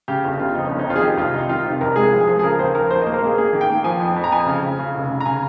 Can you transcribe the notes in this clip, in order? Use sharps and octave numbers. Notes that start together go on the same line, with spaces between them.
C#3 G4
G1
C#3 F4
F2 D#4
G1 C#4
D#4
F2 F4
G#4
D#3 G4
C2 F4
C3 D#4
D#3 F4
C3 G4
C2 A#4
G#3 G#4
F3
G#4
F3
G#4
C#3 A#4
D#2 C5
F3 A#4
D#2 C5
A#3 D#5
A#4
A#3 G#4
A#3 G#4
D#3
G5
A#3
F3 G#5
F2
F2
A#5
F2 G#5
C#3
C#3
C#3
F1
C#3
A#5
C#3 G#5